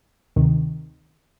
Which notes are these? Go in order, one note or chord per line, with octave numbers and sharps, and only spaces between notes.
D2 C3 D#3